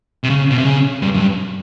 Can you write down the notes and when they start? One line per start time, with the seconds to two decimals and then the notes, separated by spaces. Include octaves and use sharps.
0.24 C3
0.30 C#3
0.50 B2
0.58 C3
0.65 C#3
1.02 G2
1.14 F#2
1.20 G2